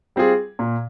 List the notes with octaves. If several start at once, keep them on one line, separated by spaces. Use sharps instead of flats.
G3 C4 F4 G#4
A#2